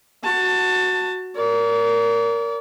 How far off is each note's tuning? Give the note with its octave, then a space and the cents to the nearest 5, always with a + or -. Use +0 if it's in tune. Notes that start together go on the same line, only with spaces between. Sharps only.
F#4 +0 A5 +20
A#4 +0 D5 -40